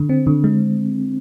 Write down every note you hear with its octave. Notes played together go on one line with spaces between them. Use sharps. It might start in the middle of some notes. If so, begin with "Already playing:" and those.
Already playing: D3
C4
D3
G#3